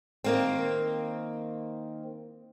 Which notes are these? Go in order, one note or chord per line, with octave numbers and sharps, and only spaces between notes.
D#3 A#3 C4